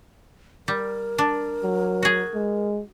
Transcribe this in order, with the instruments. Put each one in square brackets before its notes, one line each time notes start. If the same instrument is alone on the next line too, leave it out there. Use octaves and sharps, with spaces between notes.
[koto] G3 [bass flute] A#4
[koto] D4
[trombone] F#3
[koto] F#4 G#4
[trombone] G#3